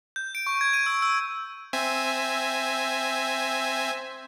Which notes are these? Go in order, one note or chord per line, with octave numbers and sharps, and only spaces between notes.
G6
D7
C#6
G#6
D#7
E6
E6
C4 E5 G#5